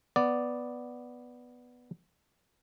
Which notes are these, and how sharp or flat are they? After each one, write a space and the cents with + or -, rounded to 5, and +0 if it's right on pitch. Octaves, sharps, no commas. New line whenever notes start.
B3 +0 D5 +0